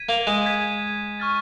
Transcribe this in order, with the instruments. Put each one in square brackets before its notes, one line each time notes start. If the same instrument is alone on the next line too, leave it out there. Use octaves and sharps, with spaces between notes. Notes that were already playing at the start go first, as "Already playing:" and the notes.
Already playing: [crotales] G#6 B6 D#7
[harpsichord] A#3
G#3
[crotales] G#6 B6 D#7
C#6 F6 A6